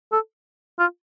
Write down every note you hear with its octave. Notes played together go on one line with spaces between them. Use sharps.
A4
F4